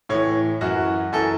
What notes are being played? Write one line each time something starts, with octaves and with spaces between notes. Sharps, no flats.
A2 E3 C#5
F#2 E3 F#4
F#2 E3 A4